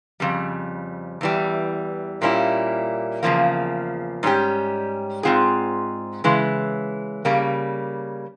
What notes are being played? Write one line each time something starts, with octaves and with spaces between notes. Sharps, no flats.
F2 C#3 G3
E2 E3 G3
A#2 G3 A#3 C#4 E4
E2 C#3 F3 A#3
G#2 G3 C#4 G4
G#2 F3 C4 F4 G#4
C#3 E3 G#3
C#3 G3 A#3